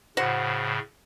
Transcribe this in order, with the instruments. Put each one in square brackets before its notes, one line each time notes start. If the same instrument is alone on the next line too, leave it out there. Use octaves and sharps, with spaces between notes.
[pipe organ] A2 C#3 [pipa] F#4 C5 F#5